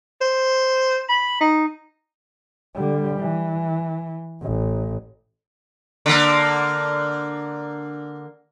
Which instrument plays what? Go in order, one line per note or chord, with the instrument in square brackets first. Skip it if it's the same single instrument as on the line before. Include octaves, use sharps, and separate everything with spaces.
[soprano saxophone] C5
B5
D#4
[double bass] D3 G3
E3
A1
[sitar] D3 A#3